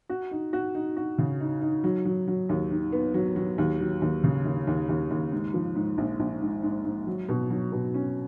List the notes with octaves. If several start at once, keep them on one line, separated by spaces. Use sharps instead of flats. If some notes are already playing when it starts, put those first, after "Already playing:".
F#4
D#4
F#4
D#4
F#4
C#3
D#4
D#4
F#3
F#3
F#3
D#2
D#3
B3
F#3
F#3
D#2
F#3
D#2
C#3
D#2
D#2
D#2
D#2
G#2
F3
G#2
A#1
A#1
G#2
G#2
G#2
F#3
B2
F#3
B2
C#4